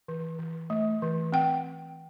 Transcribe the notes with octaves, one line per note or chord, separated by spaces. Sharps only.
E3
E3
A3
E3
C4 G5